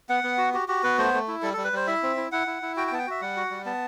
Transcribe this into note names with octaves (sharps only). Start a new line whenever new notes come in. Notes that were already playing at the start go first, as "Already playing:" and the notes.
B3 F#5
B3
F#4
F#4 G4
F#4 G4
B3 B4
A3 C5
A3
E4
G3 A4
G3 A4
B4
G3 C5
E4 E5
C4
E4
E4 F#5
E4
E4
F#4 G5
G5
B3 A5
G5
F#4 E5
G3 F#5
F#4
G3
B3 A5